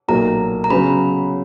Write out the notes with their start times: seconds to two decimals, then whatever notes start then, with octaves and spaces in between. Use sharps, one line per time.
0.08 B1 A#2 F#3 A#3 A#5
0.64 A#5
0.70 C#3 F#3 B3 B5